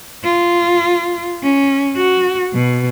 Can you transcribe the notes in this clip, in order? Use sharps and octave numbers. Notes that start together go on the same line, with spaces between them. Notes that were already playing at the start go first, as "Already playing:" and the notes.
F4
C#4
F#4
B2